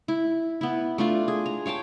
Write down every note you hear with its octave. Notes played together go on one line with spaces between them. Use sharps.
E4
B3 E4
A3 D4 F4
G#4
A#5
C#5 F5 G5 A5